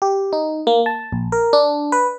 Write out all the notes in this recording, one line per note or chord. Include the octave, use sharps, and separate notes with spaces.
G4
D#4
A#3
A5
A#1
A#4
D4
B4